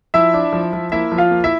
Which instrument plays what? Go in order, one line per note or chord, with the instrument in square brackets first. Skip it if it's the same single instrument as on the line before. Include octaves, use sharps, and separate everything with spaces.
[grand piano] F3 E4 E5
D4
F3
F3
A#3 E4 E5
F3
F4 F5
A#3
E4 E5